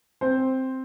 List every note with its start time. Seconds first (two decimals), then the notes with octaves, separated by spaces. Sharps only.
0.21 C4 C5